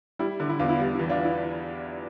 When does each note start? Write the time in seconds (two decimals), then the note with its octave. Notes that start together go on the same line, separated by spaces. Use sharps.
0.19 G3 E4
0.40 D3
0.49 E4
0.59 E2 F4
0.69 E4
0.79 G3 D4
0.95 E4
0.99 E3
1.09 D4 F4
1.25 E4